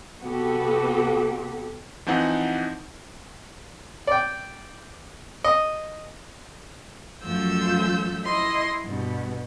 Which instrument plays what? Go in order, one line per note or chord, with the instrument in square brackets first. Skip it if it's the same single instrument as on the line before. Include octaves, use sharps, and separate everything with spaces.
[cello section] C3 B3 F#4 G4 A4
[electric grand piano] E3 F3 C4 D#4 F#5
[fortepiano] D5 G5
D#5
[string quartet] F#2 F3 A3 F4 E6 G6
E4 D#5 C6
G2 B2